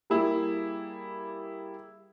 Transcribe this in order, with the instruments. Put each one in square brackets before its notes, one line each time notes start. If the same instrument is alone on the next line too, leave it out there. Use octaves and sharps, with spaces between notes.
[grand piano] G3 A#3 E4 G#4